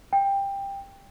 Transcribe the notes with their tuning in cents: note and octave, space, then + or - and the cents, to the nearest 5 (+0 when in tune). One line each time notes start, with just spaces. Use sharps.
G5 +15